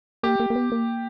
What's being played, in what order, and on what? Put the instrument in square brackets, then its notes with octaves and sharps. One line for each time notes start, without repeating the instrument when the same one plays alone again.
[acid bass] A#3 [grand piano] G4
[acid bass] A#3
A#3
B3
A#3